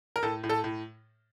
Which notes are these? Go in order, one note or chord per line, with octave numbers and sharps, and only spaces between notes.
A#4
A2 A4
A2
A4
A2